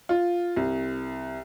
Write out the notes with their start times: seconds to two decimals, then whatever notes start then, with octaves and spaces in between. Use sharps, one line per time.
0.09 F4
0.56 C2